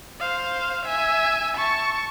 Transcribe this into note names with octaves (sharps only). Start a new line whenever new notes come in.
C5 F5
E5 G#5
A5 C#6